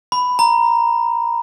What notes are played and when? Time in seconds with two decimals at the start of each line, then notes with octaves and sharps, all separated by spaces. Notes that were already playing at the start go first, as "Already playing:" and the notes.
0.12 B5
0.39 A#5